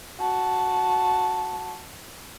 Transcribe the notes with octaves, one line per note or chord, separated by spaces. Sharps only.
F#4 A5